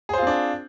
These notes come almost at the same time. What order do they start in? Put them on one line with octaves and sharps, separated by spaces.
G#4 C5 F4 C4 D4